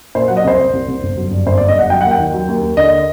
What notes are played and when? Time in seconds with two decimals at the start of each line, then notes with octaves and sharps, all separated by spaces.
0.15 A#2 C5
0.28 F#3 F#5
0.37 D#5
0.44 C2 C5
0.59 C2
0.73 C2
0.88 C2
1.03 G1
1.17 F#3
1.31 G2
1.46 G1 C5
1.58 D5
1.60 G1
1.68 D#5
1.76 G2 F#5
1.90 F#3 G5
2.01 D#2 F#5
2.11 G5
2.19 D#3
2.33 F#3
2.48 D#2
2.63 D#2
2.77 D3 D#5